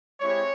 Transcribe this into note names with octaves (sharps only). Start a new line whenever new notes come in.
G#3 C4 E4 G4 C#5